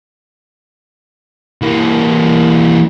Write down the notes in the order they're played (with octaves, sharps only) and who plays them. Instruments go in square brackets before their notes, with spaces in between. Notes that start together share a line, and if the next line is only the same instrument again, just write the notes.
[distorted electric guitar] E3 A#3